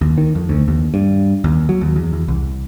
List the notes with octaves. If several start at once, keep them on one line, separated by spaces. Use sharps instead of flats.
D#2
D#3
F2
D2
D#2
G2
D#2
F#3
D#2
E2
E2
C2